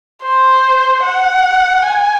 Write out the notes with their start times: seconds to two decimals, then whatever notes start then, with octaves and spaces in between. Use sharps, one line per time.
0.23 C5
1.03 F#5
1.83 G#5